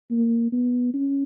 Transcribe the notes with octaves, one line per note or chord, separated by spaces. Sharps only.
A#3
B3
C#4